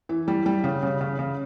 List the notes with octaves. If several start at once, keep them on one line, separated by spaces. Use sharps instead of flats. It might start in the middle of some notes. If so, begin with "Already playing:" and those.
E3
G3
G3
C#3
C#3
C#3
C#3